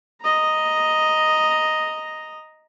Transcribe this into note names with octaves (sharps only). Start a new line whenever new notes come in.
D#5 A#5